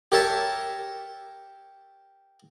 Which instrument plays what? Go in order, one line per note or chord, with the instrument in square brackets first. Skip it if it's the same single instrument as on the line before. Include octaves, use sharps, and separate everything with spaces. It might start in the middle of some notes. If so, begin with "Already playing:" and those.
[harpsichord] G4 A#4 C#5 E5 A5